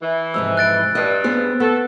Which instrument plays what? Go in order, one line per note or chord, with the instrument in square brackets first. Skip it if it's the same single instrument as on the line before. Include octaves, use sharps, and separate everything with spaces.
[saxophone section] E3
[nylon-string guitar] F2 G#2 C3 [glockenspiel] E6
[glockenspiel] F#6 A6 D7
[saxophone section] G2 [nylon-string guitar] D#5
[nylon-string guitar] B3 G#4 C5
[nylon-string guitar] B3 [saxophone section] A4